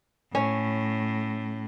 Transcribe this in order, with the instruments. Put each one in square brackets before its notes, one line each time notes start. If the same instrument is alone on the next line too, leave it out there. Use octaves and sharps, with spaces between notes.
[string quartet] A2 [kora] C#4